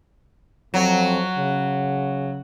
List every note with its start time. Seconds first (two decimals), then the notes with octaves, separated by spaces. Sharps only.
0.74 F2 F#3
1.37 C#3